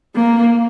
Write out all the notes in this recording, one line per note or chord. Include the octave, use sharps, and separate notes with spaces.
A#3